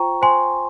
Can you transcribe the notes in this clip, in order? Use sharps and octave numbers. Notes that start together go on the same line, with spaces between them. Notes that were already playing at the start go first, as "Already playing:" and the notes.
Already playing: F4 C5 G5 A#5 C#6
C5 G#5 C6